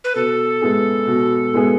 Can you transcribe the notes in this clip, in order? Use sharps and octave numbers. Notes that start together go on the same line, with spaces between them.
B4
B2 A4
G#3 B3 E4 G#4
B2
G#3 B3 E4 G#4